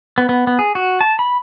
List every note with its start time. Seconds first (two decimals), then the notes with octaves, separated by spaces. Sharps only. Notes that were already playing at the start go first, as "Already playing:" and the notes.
0.18 B3
0.29 B3
0.47 B3
0.59 G#4
0.75 F#4
1.01 A5
1.19 B5